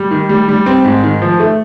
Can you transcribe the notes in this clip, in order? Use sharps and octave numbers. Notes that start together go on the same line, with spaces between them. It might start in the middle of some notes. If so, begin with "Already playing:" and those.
Already playing: G3
D#3
G3
G3
C4
G#2
D#3
F3
A3